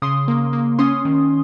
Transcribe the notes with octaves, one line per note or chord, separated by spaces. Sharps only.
C#3 C6 D#6
A#3
A#3
C#4 C6 D#6
D#3